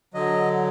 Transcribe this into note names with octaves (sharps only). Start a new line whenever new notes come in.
D3 F#3 D#5